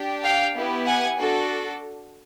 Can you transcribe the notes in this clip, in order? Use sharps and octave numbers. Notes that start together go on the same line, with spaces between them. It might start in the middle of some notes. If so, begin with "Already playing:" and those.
Already playing: D4 G4
F5 G5
B3 E4 G4
F#5 G#5
D4 F#4 A4